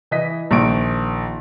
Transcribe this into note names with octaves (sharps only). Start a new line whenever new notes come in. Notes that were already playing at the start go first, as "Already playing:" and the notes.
E3 D#5 B6
A#1 D#3 C#6 D7